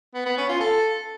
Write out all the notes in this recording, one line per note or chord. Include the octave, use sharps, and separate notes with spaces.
B3
B3
C#4
F4
A4